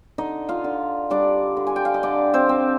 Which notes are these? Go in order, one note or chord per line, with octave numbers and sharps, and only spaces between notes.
D3 D#4 D#5
F4 F5
D3
G3 D4 D5
D3
G#5
G5
F5
D#5
D3 D4 D5
C4 C5
C4